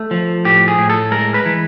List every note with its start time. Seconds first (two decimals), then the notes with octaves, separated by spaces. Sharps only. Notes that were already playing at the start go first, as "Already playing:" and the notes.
Already playing: A3
0.11 F3
0.45 A2 G4
0.68 G#4
0.78 A2
0.90 A4
1.11 G#3 A#4
1.34 B4
1.46 E3